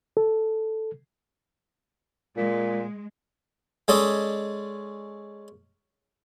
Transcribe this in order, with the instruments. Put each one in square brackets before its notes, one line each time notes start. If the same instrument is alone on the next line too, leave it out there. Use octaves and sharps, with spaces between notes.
[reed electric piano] A4
[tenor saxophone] A#2 [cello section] G#3
[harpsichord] G#3 C#4 A4 D5 D#5